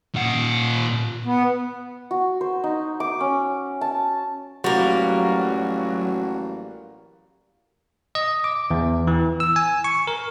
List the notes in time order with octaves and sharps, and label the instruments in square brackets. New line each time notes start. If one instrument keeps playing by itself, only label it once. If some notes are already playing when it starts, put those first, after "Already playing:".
[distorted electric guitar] A#2 F#5
[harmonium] B3
[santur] F#4
C5
D#4
D6
C#4
A5
[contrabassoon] A1 [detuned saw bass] F#3 [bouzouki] G3 A#3 [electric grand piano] F#4
[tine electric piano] D#5
D6
E2
E3
E6
G#5
C#6
A#4